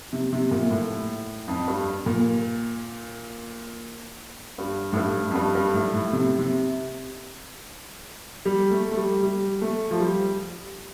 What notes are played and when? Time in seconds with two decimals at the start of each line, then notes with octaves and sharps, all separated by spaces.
0.13 C3
0.33 C3
0.51 A#2
0.71 A2
1.48 F2
1.68 G2
2.06 A#2
4.58 G2
4.93 A2
4.97 G2
5.31 F2
5.35 G2
5.55 G2
5.74 A2
5.93 A2
6.13 C3
6.38 C3
8.45 G3
8.71 A3
8.91 A3
8.97 G3
9.23 G3
9.62 A3
9.91 F3
10.00 G3